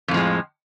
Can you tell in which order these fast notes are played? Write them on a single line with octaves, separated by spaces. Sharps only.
F2 A2 F3 G#3